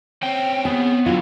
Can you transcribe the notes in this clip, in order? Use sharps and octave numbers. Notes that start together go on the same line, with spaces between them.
C4 C#4 G5
B3 G#4
D3 F#3 E4 F4